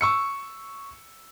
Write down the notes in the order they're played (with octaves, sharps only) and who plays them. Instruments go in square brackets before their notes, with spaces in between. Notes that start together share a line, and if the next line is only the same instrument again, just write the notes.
[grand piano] C#6 E6 C#7